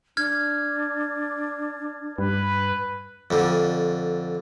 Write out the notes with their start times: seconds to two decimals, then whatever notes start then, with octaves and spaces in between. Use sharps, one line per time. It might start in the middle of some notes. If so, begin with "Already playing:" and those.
0.17 D4 F6 G#6
2.18 G2 B4
3.31 F2 D3